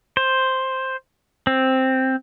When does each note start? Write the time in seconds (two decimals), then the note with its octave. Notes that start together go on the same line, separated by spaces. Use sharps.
0.17 C5
1.47 C4